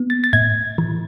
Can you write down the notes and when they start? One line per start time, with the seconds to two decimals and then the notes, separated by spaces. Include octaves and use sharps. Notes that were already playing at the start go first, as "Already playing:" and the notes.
Already playing: B3
0.10 A6
0.24 A6
0.33 A2 G#6
0.78 E3